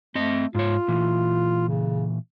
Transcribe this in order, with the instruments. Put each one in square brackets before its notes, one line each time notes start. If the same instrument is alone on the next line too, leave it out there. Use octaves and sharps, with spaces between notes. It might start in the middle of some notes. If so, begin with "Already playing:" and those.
[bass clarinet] A3 [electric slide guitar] C4 D#5
[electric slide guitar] G#2 C#5 [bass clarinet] F4
[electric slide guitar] A#2 E3
[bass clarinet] C#3